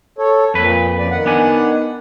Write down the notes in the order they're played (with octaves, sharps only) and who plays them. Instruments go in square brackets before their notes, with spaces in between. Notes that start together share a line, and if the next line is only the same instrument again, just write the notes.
[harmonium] A4 C#5
[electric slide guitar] F2 B4 [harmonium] A#2
[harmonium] F#2 F3 D5
D#3 F#5
[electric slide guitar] B3 D4 G#5